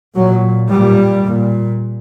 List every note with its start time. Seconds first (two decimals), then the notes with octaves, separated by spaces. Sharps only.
0.16 A#2 F#3
0.71 A#2 G3
1.26 A#2